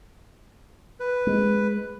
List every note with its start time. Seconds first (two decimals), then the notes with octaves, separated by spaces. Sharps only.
1.00 B4
1.27 G#3